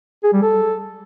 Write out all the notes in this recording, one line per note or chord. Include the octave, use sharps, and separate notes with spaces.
G#4
G3
A4